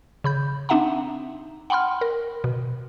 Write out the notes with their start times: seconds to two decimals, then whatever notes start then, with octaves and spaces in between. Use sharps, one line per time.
0.24 C#3 B5 G6
0.69 C4 D4 D#4 E5 F#5 A#5
1.70 F#5 G5 B5 C6 F6
2.01 A#4
2.44 B2